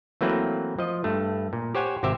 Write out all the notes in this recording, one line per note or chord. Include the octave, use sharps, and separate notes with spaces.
E3 F#3 A3 A#3 C4 B4
F3 D#5
G2 A3
A#2
G4 C5 C#5 F#5 G#5
G#1 C3 G4 C5 E5